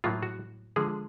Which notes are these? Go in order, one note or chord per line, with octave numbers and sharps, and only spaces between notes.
A2 F#3 A#3 F4
F#4
D3 F3 G#3 G#4